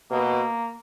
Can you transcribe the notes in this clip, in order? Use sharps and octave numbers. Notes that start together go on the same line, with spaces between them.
B2 A#3